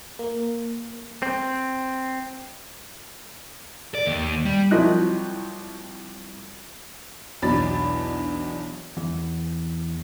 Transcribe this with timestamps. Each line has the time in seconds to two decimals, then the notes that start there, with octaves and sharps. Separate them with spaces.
0.19 A#3
1.22 C4
3.95 D5
4.06 D#2
4.45 G3
4.71 C2 F3 F#3 E4 D#5 F#6
7.42 B1 E2 F#3 D4 B5 A6
8.97 E2